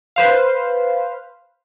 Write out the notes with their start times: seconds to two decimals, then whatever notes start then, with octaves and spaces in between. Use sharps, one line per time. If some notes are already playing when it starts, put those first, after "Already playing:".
0.16 B4 C5 F5